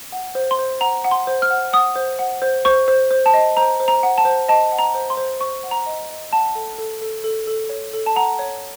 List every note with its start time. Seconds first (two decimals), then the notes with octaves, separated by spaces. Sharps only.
0.12 F#5
0.35 C5
0.51 C6
0.59 C5
0.81 F#5 A#5
1.04 F#5
1.11 C6
1.27 C5
1.42 F6
1.51 F#5
1.73 F#5 D#6
1.96 C5
2.19 F#5
2.42 C5
2.65 C5 C#6
2.88 C5
3.11 C5
3.26 A5
3.34 D#5
3.57 C5 A#5
3.80 C5
3.88 A#5
4.03 F#5
4.18 A5
4.25 C5
4.48 D#5 A5
4.72 F#5
4.79 A#5
4.95 C5
5.10 C6
5.17 C5
5.40 C5 C#6
5.63 F#5
5.71 A#5
5.86 D#5
6.10 D#5
6.32 F#5 A5
6.55 A4
6.78 A4
7.02 A4
7.24 A4
7.47 A4
7.69 C#5
7.93 A4
8.06 A5
8.16 F#5 A#5
8.39 C#5